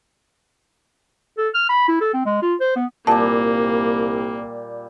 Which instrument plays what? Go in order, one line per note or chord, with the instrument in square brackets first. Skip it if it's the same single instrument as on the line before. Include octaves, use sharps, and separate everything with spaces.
[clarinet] A4
F6
B5
E4
A4
C4
G#3
F4
C5
B3
[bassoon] C2 [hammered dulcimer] A#2 G3 [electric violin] A#3 [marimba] A5